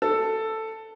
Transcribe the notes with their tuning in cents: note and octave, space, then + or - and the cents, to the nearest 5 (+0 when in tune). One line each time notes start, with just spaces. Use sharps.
A4 +5